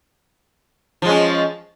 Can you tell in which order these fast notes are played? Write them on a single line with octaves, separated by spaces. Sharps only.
F3 G#3 C#4